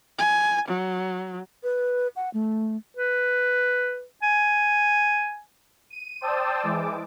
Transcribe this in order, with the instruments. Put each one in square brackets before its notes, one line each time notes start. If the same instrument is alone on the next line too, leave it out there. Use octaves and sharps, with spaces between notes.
[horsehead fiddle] G#5
F#3
[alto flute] B4
F#5
A3
[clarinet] B4
G#5
[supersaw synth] D#7
C5 D5 G5 A5 D#6 E6
E3 G#3 D6